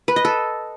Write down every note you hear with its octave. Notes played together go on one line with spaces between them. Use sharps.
B4
D#5
A4